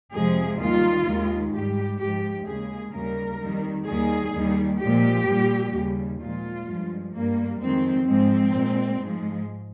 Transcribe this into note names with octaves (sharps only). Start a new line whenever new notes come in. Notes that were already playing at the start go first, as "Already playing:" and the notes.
F2 C3 F3 G#3 G#4
D#2 D#3 G3 F4
D#2 D#3 G#3
G#2 G3 G4
G#2 F3 G#3 G4
D#2 C#3 G#3 G#4
D#2 C#3 G3 A#4
F2 D#3 G3
D#2 D#3 G3 G#4
D#2 D#3 G3
A#2 F3 G#3 G4
A#2 G3
D#2 C#3 G3
A#2 F3 G#3 F4
G2 F3 G#3
G2 G3 A#3
F2 D#3 G#3 C4
G#2 F3 G#3 C4
A#2 G#3
G#2 F3 G#3